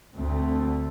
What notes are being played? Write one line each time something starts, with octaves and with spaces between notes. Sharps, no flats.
D2 D3 A3 C4